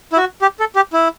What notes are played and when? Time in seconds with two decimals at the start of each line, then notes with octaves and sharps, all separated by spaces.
0.13 E4
0.17 F#4
0.42 G4
0.60 A4
0.76 G4
0.93 E4